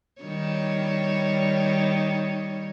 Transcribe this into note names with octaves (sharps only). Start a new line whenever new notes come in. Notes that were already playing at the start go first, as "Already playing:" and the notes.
D#3 G3 C#5